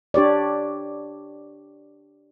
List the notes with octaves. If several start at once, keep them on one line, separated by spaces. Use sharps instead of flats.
D4 G4 C#5 D5